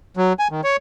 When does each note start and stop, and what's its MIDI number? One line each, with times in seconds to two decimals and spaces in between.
0.17 0.33 54
0.39 0.48 80
0.51 0.61 51
0.64 0.76 73